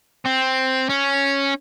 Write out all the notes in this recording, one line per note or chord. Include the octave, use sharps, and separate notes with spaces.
C4
C#4